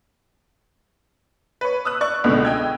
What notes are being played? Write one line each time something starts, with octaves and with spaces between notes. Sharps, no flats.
B4 C#5
D#6 E6 F#6
D5 C#6 F#6
C#2 B2 D3
D#5 G5 E6 G#6